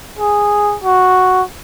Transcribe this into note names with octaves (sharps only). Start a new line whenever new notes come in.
G#4
F#4